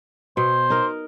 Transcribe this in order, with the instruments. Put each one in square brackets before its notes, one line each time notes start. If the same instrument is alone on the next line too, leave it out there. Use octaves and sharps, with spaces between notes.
[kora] B2 [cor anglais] C5
[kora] D#4 A#4